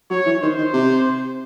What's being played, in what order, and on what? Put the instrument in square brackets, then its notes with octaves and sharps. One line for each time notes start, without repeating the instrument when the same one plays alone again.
[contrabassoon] F#3 [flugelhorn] C#5
[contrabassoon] E3
[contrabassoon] D#3 [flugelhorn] C5
[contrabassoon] D#3
C3